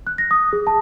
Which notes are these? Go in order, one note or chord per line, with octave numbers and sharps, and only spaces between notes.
F#6
A#6
D#6
G#4
A5